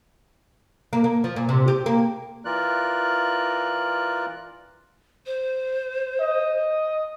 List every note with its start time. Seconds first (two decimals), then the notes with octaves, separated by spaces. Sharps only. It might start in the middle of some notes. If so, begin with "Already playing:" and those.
0.93 A#3
1.04 A#3
1.24 F3
1.36 A#2
1.49 C3
1.68 G4
1.86 A#3
2.45 E3 F4 A#4 D5 F#6
5.26 C5
6.20 D#5